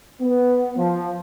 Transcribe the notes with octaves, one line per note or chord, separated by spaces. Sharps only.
B3
F3